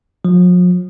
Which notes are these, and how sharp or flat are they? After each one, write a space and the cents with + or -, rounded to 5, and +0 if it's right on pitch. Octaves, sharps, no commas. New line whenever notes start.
F3 +45